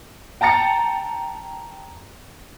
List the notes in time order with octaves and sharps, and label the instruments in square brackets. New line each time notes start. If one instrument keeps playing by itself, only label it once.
[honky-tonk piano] G5 A5 A#5 A6 C#7